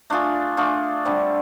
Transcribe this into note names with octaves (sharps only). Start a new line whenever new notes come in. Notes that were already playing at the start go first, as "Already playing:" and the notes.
A3 D4 F4 G#4
A3 D4 F4 G#4
D3 G3 C4